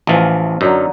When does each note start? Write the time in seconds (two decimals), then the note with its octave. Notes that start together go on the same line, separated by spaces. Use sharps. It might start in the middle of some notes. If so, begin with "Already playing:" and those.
0.07 A1 E3 F3 F4 D#5
0.61 F#2 D3 F#3 D#4